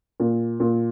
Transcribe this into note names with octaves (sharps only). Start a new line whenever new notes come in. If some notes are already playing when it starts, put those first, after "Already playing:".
A#2
A#2